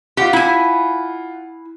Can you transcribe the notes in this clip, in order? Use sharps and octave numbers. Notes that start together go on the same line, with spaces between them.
F4 G4 F#5
E4 G#5